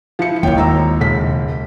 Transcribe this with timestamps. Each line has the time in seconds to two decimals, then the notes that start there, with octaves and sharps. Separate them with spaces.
0.19 F3 E4 C#7
0.43 D#2 E4 C#5 G5
0.57 G#1 A#5 E6
1.00 E1 C#2 B6